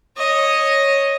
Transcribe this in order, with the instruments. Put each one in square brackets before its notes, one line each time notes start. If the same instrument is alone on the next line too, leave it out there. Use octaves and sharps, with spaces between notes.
[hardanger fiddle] C#5 D#5